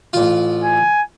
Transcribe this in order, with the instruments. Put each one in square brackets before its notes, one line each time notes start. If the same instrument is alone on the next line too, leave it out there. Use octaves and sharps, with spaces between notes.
[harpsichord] A1 F4
[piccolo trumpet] G#5